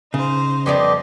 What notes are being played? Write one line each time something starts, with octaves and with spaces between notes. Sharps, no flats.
C#3 D#4 C5
F2 B3 G4 D5 D#5 C6